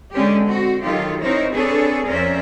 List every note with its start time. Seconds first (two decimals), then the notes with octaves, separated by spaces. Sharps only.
0.14 D3 G#3 C#4 G4
0.44 C4 F#4
0.81 D#3 F#3 F4 G4 A4
1.22 C4 D#4 E4 A#4 C5 C#5
1.52 C4 D4 G#4 A4 B4 C#5
2.06 F2 C#4 A#4 C5 D5 E5